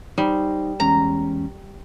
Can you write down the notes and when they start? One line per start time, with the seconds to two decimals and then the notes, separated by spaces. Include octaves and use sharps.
0.18 G3 D#4 C5
0.80 E2 G#3 C#4 A#5